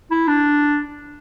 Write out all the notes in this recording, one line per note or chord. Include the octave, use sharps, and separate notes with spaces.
E4
D4